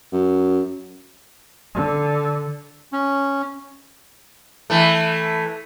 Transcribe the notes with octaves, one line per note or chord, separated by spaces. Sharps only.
F#2
D3
C#4
E3 A3